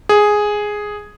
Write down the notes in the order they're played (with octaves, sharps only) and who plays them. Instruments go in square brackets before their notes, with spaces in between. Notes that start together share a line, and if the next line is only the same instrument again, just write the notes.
[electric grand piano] G#4